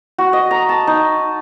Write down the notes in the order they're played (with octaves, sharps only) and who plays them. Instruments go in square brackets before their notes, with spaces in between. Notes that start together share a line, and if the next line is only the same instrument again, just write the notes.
[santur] F#4
D#5
A#5
A5
D#4